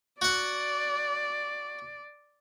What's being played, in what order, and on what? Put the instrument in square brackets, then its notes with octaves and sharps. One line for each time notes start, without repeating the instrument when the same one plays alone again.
[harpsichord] F#4 F#5 [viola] D5